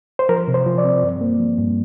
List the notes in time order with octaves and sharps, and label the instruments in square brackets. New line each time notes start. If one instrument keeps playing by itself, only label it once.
[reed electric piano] C5
F3 A#4
C3
C5
F3
D5
C4
G2
A#3
F3
G2